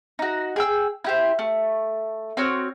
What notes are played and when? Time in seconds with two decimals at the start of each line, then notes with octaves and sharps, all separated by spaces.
0.19 D#4 F#4
0.56 G#4 G5 E6
1.04 E4 G4 C5
1.39 A3
2.37 C4 F#4 C#5 F6